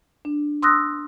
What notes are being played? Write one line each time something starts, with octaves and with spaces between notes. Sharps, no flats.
D4
C6 D#6 E6 F#6 A#6